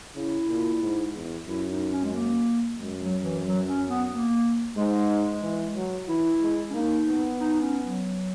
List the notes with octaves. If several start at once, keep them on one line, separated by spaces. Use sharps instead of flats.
C#3 E4
A#2
G#2
E2
F#2 E4
D#4
C#4
G#3
A#3
F#2 G#3
F#3
E3
F#3
C#4
B3
A#3
G#2 G#3
E3
F#3
E3 E4
G#3
C#4
A#3 D#4
B3
D#4
D#4
C#4
F#3